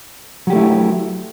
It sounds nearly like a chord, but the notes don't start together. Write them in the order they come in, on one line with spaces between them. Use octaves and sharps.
F#3 G4 A3 E4